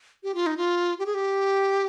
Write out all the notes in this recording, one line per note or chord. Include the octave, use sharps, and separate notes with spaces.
G4
F4
D#4
F4
G4
G#4
G4